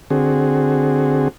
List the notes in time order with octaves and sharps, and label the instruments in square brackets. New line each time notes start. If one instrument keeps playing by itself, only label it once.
[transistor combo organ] D3 C4 F#4 G#4